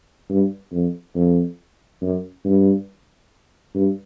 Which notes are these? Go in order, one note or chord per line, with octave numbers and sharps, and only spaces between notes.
G2
F2
F2
F#2
G2
G2